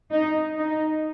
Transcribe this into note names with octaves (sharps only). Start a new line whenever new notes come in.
D#4
D#4